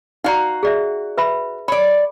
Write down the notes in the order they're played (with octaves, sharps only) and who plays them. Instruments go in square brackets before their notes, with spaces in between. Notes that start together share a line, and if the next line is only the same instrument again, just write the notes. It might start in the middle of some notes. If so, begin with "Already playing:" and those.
[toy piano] D#4 D5 A#5 [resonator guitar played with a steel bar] F#4 F5
[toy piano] G#4 D5 E5
B4 E5 B5
[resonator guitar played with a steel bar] C#5 D5 [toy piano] B5